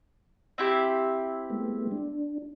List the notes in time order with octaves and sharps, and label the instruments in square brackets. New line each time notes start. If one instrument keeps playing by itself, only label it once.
[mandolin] C4 E4 G4
[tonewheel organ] G#3 A3 B3
D4